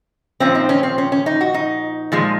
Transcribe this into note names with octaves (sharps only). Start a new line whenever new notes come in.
A#2 F3 C4 C#4
D#4
C#4
C4
C#4
C#4
D#4
F#4
D#4
A#2 F3 G#3